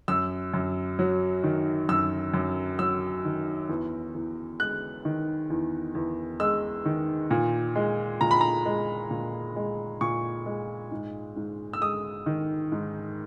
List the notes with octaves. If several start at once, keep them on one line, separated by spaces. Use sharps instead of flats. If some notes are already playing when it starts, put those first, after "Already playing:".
F#2 E6
F#2
F#3
D#3
F#2 E6
F#2
F#3 E6
D#3
E2
E2
G#3 F#6
D#3
E2
E2
G#3 E6
D#3
A#2
G#3
A#2 A#5
B5
A#5
G#3
A#2
G#3
A#2 C#6
G#3
G#2
G#2
E6
G#3 D#6
D#3
G#2